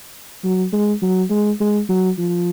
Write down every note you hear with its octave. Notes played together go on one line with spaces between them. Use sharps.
F#3
G#3
F#3
G#3
G#3
F#3
F3